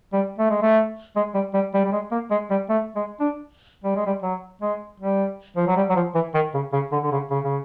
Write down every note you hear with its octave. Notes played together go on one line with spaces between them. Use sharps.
G3
A3
G#3
A3
G#3
G3
G3
G3
G3
G#3
A#3
G#3
G3
A3
G#3
D4
G3
G#3
G3
F#3
G#3
G3
F3
F#3
G3
F#3
F3
E3
D#3
C#3
C#3
D3
D3
C#3
C#3
C#3